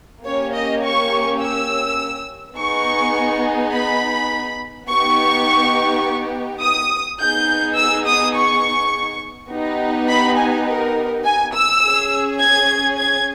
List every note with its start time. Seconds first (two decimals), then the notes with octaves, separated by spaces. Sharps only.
0.24 A#3 C#4 G4 C#5
0.53 D#5
0.83 C#6
1.41 E6
2.56 B3 D#4 G#4 C#6
3.72 B5
4.87 B3 D#4 G4 C#6
6.61 D#6
7.19 B3 D#4 G#4 G6
7.76 E6
8.06 D#6
8.35 C#6
9.50 B3 D#4 G4
10.08 B5
10.37 G#5
10.67 A#4
11.25 G#5
11.54 E6
11.83 C#4 G#4
12.40 G#6
12.98 G#6